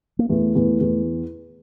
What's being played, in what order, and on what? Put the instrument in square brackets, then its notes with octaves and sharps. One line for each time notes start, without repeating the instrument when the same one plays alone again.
[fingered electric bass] A#3
[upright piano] E2 [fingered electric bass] A3
[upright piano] E2
E2